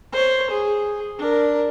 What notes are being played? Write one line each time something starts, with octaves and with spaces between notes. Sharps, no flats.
C5 C#5
G#4
D4 A#4